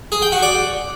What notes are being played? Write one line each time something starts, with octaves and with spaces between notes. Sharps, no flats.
G#4
G5
F#4
D5